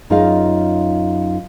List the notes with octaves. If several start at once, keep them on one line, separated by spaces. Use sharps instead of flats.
F#2 D#4 F4 G#4 D#5 F5